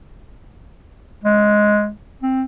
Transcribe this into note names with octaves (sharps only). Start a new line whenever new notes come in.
G#3
C4